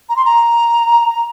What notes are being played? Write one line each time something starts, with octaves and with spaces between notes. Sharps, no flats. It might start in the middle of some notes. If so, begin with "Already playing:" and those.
A#5
C6
A#5